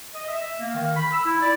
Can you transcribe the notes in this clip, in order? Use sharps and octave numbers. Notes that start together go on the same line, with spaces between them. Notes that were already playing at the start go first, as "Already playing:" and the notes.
D#5
E5
A#3
D#3
B5
E6
E4
D5